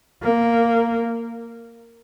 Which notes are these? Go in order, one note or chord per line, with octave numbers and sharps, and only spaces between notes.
A#3